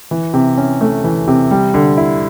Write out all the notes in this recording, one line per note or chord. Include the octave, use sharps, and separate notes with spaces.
E3
C3
C#4
A3
E3
C3
G3
D3
E4